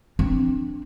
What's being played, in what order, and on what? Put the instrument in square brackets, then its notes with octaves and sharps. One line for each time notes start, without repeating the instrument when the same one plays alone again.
[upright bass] C4 D4